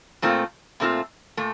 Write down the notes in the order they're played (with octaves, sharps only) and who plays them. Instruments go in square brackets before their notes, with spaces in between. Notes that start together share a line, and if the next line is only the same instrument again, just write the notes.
[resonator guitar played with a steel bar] A#2 A3 C4 F4
A#2 A3 C4 F4
A#2 A3